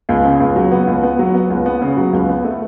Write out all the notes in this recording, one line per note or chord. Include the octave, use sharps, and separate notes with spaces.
C#2
C#3
C#2
F#3
B3
C#2
B3
F#3
B3
C#2
B3
C#3
F#3
C#2
B3
A3